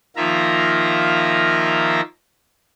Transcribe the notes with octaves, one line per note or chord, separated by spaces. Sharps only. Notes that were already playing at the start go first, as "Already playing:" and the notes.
D#3 F3 A#3 F4 E5 A#5